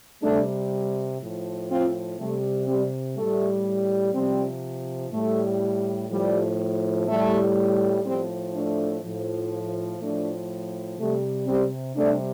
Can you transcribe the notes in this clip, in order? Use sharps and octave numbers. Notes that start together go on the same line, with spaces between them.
C3 G3 A3 D4
A2 F3
C4 F4
C3 G3 A3
G3 C4
A2 G3 A3
C3 F3 G3 C4
A2 G3 A3
A2 F3 G3
A2 G3 A3
A2 F3 G3 C4
A3 D4
A2 F3
A2 F3 A3 D4
C3 G3 A3
G3 C4
C3 G3 A3 D4